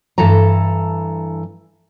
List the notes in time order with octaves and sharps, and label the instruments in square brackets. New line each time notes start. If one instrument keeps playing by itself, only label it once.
[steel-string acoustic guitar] G2 E3 A4 A5 A#5